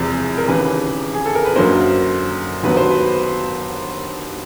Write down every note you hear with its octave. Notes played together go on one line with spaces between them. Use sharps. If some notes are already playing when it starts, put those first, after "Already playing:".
Already playing: E1 E2 C3 F3
A#4
D#2 C#3 E3 B4
G#4
A4
A#4
B4
F#2 D3 F#3 A#3 C5
D#2 D3 F#3 B3 B4
C5
B4